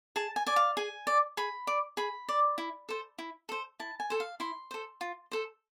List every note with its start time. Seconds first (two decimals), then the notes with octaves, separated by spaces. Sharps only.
0.16 G#4 A5
0.36 G#5
0.46 D5 G#5
0.56 F5
0.77 G#4 G#5
1.07 D5
1.37 G#4 B5
1.67 D5
1.97 G#4 B5
2.29 D5
2.58 E4
2.89 A4 C5
3.18 E4
3.49 A4 C5
3.80 E4 A5
4.00 G#5
4.10 A4 C5
4.20 F5
4.40 E4 C6
4.71 A4 C5
5.01 F4
5.32 A4 C5